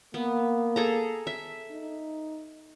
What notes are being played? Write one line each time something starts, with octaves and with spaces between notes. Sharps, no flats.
A#3 B3
G#4 A4 A#5
E5
D#4